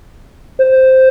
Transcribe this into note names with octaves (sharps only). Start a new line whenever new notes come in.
C5